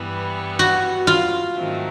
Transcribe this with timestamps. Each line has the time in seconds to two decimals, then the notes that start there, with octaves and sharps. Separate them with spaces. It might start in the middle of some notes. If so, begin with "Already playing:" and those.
Already playing: G2 E3 G3 B3
0.59 F#4
1.07 F4
1.57 G#2 D#3 F#3 A3 C4